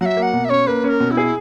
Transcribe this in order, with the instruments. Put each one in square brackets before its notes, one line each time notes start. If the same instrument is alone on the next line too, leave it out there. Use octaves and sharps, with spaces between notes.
[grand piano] F#3 [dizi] F#5
[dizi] E5
[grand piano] A#3
[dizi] F#5
[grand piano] B2
[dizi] E5
[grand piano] C#4 [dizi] C#5
[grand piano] A#3 [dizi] B4
[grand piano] C#4 [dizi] A#4
[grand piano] B2
[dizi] E4
[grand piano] G#4